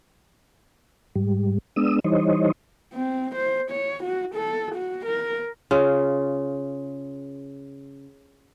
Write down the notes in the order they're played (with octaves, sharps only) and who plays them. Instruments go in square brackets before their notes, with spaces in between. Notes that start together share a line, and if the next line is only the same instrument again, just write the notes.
[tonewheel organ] G#2 G3
G#3 B3 D4 D#6 E6
E3 G3 D#4 C5 C#5 D#5
[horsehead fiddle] C4
C5
C#5
F#4
A4
F#4
A#4
[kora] C#3 F4